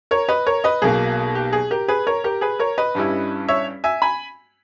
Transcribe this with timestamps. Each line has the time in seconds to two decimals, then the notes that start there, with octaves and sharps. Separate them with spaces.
0.11 A#4 C#5
0.28 B4 D#5
0.46 A#4 C#5
0.64 B4 D#5
0.82 B1 B2 A#3 G#4
1.35 G4
1.53 G#4
1.71 G4 A#4
1.88 G#4 B4
2.07 A#4 C#5
2.24 G4 A#4
2.41 G#4 B4
2.59 A#4 C#5
2.78 B4 D#5
2.95 G2 G3 C#4 E4
3.48 C#5 E5
3.84 E5 G#5
4.02 G#5 B5